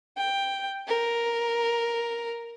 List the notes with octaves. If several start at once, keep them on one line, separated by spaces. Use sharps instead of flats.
G5
A#4